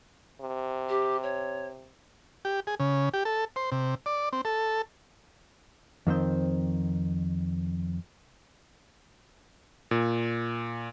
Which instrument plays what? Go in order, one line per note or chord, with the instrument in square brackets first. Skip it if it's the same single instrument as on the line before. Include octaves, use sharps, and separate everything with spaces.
[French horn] C3
[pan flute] G4
C#5
[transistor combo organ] G4
G#4
C#3
G4
A4
C5
C3
D5
C4
A4
[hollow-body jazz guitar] F2 D#3 C4 C5
[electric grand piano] A#2